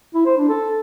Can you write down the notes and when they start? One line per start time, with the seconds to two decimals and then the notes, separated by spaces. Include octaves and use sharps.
0.14 E4
0.26 C5
0.37 D4
0.49 A4